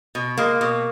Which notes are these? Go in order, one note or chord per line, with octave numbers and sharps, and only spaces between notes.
B2
G#3 A#3
B2